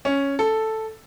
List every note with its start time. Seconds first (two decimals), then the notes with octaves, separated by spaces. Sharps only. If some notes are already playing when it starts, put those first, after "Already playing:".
0.05 C#4
0.39 A4